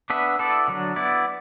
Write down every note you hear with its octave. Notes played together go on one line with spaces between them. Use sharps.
B3 D4 B4 E5
B3 E4 A4 D5
D3 F#3 D4
B3 E4 D5